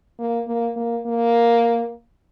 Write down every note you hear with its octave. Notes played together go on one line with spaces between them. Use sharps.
A#3
A#3
A#3
A#3